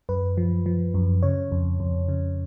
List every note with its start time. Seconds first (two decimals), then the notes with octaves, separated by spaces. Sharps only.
0.09 F#2 B4
0.37 F3
0.66 F3
0.94 F#2
1.23 C#3 C#5
1.52 F2
1.80 F2
2.09 C#3